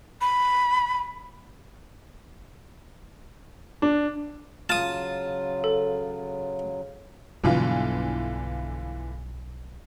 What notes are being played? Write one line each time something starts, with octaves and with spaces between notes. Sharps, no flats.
B5
D4
C#3 F#3 F4 A5 D#6
A4
B1 G2 B2 D3 E3 F4